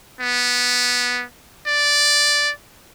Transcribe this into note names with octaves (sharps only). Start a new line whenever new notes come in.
B3
D5